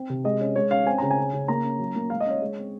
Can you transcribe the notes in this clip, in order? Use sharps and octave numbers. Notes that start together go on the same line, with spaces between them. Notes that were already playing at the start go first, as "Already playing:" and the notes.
Already playing: C4
C3
G#3 D#5
C#4
G#3 C#5
C#4 F5
C4 G#5
C#3 A#5
G#5
C#4
C#3
A#3 A#5
C#4
F#3
A#3
G#3 F5
D#5
C#4 C#5
G#3
C4